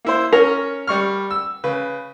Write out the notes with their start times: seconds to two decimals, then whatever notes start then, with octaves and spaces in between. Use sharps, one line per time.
0.05 A#3 E4 C5
0.32 C#4 A#4 C#5
0.87 G3 C#6 F6
1.31 E6
1.64 C#3 B4